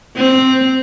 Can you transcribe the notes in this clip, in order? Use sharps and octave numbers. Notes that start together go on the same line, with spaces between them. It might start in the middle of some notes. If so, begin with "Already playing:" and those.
C4